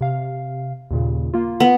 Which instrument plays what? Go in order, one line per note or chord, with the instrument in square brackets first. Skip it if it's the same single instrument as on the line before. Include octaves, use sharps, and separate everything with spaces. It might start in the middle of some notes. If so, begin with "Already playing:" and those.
[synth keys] C3 F5
D#2 A#2 C#3
A#3 F4
[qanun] B3